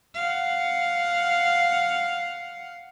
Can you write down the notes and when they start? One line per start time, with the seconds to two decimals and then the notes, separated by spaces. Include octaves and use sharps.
0.15 F5 F#5